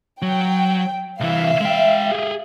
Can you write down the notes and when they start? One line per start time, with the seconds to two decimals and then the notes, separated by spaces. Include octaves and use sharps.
0.22 F#3 G5
1.20 C2 E3 E5 F5
1.61 G#3 G5
2.12 G4 G#4